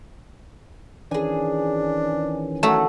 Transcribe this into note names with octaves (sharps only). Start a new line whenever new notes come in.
D#3 E3 C#4 D4 G#4 G#5
F#3 A3 F#4 F5 F#5